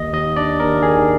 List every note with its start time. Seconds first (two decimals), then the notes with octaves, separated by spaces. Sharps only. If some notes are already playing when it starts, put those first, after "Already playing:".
Already playing: D#2 D#5
0.13 D#2 D#5
0.36 D4 D5
0.60 D#2 A#4
0.83 D#3 G#4